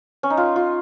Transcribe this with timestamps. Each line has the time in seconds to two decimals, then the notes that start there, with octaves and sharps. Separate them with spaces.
0.23 C#4
0.30 D#4
0.37 F4
0.56 F4